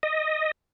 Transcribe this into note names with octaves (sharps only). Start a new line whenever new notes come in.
D#5